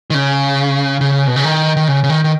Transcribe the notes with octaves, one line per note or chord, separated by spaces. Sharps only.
D#3
C#3
C#3
B2
C#3
D#3
D#3
C#3
C#3
D#3
D#3